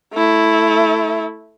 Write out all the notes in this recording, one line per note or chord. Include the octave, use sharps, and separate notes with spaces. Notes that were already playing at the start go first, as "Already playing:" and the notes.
A3 E4